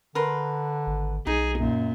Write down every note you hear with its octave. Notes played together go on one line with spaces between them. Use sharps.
D3 A#4 B4 C6
G#1
B1 D#4 G#4
F#2 A#2